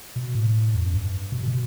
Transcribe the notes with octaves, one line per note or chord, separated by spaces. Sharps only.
B2
A2
E2
F#2
G2
B2
C3
B2